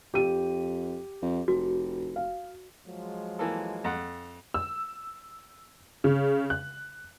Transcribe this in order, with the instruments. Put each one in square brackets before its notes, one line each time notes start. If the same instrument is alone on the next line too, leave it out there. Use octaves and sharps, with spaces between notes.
[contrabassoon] F2 [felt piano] G4 D#7
[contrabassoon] F2
[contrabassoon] F1 [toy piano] F#4
[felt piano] F5
[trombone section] F3 F#3 G#3
[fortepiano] E3 A#3 A4
F2 F#5
[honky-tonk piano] E6
C#3
F#6